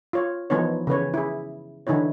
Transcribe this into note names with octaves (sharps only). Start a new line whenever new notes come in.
F4 C#5
E3 F3 B3 D#4 C#5
C#3 E3 B4 C#5
E4 G#4
D3 E3 D#4 E4 C#5